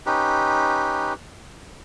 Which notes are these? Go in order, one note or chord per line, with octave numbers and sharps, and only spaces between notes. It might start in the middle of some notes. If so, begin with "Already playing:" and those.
C#4 D#4 G4 B4